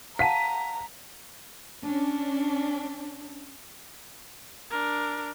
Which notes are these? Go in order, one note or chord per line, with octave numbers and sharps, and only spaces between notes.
F5 F#5 A5 A#5 B6 D#7
C#4 D4
D4 A#4